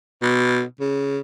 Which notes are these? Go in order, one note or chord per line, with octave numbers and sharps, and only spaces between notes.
B2
C#3